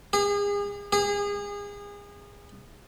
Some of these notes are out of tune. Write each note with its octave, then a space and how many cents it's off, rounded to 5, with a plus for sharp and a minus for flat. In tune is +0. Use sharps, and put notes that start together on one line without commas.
G#4 -35
G#4 -30